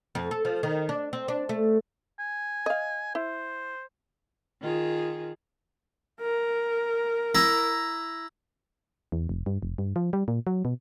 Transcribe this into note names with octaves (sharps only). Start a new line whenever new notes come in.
F2
A4
F3
D#3
D4
C4
D4
A3
G#5
D#5 F5
E4 C5
D#3 F4 G#4
A#4
E4 A#5
E2
F1
G2
F1
G2
F3
G3
A#2
F#3
B2